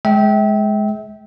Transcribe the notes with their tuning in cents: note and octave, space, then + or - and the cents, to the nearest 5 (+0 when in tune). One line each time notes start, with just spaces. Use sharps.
G#3 +15 E5 -30 G5 -10